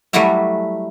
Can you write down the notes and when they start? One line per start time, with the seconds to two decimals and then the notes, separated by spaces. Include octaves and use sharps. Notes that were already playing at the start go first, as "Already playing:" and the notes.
0.13 F#3 G3 A3 E4 F#4 E5